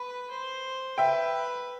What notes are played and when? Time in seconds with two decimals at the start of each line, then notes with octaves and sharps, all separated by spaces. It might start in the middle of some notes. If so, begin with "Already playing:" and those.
Already playing: B4
0.31 C5
0.98 B4 E5 G5